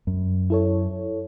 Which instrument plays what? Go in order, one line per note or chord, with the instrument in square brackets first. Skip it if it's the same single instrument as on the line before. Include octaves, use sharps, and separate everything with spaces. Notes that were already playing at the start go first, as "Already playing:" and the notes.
[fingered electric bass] F#2
[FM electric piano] E4 A4 C#5